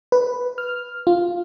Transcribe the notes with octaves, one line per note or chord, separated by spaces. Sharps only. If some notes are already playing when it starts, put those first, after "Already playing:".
B4
F6
F4